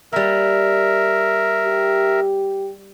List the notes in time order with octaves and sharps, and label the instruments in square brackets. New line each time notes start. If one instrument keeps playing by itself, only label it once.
[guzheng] G3 A#3 [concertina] A#4 E5
[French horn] G4